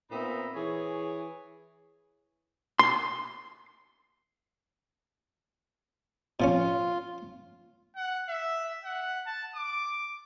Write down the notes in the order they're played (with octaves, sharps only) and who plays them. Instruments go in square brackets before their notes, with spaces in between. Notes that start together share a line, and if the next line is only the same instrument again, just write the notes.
[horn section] A#2 B3 C4 D#4 E5 B5
E3 G#4 C#5
[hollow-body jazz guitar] C6
[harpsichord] B2 F3 C#4 [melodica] F4
[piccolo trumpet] F#5
E5
F#5
A5
D6